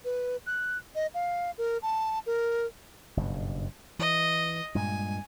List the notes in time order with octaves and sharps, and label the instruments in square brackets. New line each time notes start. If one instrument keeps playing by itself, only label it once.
[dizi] B4
F#6
D#5
F5
A#4
A5
A#4
[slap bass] F#1 G2 B2
[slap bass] E3 [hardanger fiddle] D#5
[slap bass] G2 A#2 G#3 [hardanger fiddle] G#5